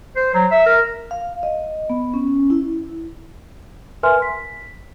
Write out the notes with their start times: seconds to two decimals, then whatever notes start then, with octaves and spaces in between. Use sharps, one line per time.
0.16 C5
0.34 F#3
0.51 E5
0.66 A#4
1.11 F5
1.43 D#5
1.89 B3
2.14 C#4
2.50 E4
4.03 A#4 B4 E5 G#5 C6 F6
4.22 B6